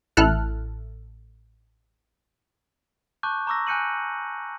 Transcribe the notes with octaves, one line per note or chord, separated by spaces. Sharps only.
A1 E4 A4 F6 F#6
A5 C#6 D6 F#6 G6
A#5 C#6 D6 E6 A#6
G#5 F#6 G6 C#7 D#7 F#7